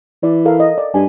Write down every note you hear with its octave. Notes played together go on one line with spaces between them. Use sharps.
E3 D5
A4 A#4 F5
D#5
D5
G2 G#5